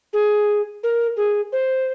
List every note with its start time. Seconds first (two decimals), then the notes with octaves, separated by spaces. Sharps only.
0.13 G#4
0.83 A#4
1.17 G#4
1.52 C5